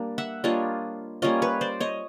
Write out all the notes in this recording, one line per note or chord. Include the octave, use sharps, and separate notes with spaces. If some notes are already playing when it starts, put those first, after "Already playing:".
Already playing: G3 A#3 D4
E5 F#5
G3 A#3 D4 F4 C#5 D#5
G3 A#3 C#4 F4 C#5 D#5
B4 C#5
C5 D5
C#5 D#5